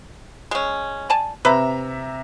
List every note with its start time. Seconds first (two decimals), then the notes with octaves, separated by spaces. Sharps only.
0.51 G#3 C#4
1.10 D5 G#5 A5
1.45 C3 B4 E5 A#5